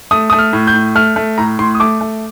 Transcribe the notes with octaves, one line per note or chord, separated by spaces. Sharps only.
A3 D#6
A3 D#6
F6
A2
G6
A2
A3 F6
A3
A2 A#5
A2 C6
D#6
A3 D6
A3